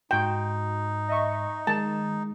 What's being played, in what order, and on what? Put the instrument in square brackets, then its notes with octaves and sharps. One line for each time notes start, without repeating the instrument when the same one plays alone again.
[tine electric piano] G#2 C6 [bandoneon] D#4 [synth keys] F#4 [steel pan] G5
[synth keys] D#5 E5 C#6
[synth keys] D#3 [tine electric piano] G#3 [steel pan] A5